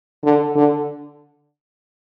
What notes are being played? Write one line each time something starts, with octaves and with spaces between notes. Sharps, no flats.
D3
D3